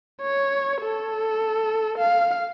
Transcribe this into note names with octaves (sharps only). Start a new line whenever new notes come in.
C#5
A4
F5